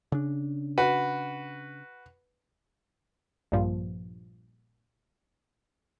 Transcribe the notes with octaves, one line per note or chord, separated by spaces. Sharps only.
C#3 D4
F#4 B4
A#1 G2 A#2 F3